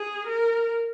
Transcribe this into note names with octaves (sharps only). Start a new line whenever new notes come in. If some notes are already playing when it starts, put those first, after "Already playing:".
Already playing: G#4
A#4